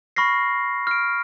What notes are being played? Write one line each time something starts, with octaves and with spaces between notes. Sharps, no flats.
B5 C#6 F6 A#6 C7
F6 D7